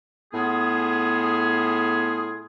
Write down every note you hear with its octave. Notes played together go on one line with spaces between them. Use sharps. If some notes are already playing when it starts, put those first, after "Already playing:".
A2 B3 F4 G#4